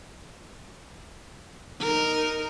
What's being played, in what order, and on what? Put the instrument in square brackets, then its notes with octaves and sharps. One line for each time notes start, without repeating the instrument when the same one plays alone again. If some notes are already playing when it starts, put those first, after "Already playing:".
[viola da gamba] D#4 A#4